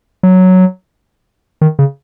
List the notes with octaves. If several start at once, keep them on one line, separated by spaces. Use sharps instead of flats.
F#3
D#3
C#3